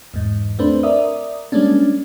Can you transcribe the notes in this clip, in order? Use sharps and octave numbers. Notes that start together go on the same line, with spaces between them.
E2 G#2
A3 C4 D4 B4 C5
A#4 D5 E5 D#6
G3 G#3 A#3 C#4 D4